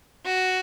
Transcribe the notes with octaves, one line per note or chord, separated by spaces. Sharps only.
F#4